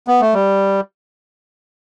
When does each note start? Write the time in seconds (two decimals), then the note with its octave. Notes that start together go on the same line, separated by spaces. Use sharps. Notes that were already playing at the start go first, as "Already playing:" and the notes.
0.08 B3
0.21 A3
0.34 G3